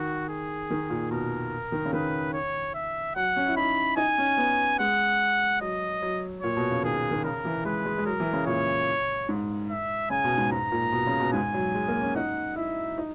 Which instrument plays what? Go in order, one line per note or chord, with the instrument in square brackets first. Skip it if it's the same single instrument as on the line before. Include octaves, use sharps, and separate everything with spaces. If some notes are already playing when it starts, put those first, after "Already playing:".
Already playing: [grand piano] D#3 [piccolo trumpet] F#4
[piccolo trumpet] G#4
[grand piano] D#3
A#2
[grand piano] B2 [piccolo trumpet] A#4
[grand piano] D#3
C#3
[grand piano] D#3 [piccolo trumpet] B4
[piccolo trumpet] C#5
E5
[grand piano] F#3 [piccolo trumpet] F#5
[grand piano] C#4
E4
[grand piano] D#4 [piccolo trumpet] B5
[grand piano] D#4 [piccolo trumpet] G#5
[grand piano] C#4
B3
[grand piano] G#3 [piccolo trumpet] F#5
[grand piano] F#3 [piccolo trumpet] D#5
[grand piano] F#3
[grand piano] A#2 [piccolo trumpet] C#5
[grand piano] B2
C#3
[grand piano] D#3 [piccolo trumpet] G#4
[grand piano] D#3
[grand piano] C#3 [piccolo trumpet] A#4
[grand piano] E3
[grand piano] G#3 [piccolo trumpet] B4
[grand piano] G#3
G#3
[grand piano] F#3 [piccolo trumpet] A#4
[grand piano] E3
C#3
[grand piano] A#2 [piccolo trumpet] C#5
[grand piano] G#2
[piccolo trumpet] E5
[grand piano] C#3 [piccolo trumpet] G#5
[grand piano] B2
G#2
[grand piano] G#2 [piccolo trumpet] A#5
[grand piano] A#2
B2
C#3
B2
[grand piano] G#2 [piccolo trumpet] G#5
[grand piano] F#3
G#3
A#3
C#4
[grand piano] D#4 [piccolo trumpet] F#5
[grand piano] E4 [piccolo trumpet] E5
[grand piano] D#4